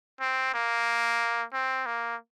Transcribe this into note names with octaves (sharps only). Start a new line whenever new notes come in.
C4
A#3
C4
A#3